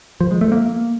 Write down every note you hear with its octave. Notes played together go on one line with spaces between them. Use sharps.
F3
G#3
A3
A#3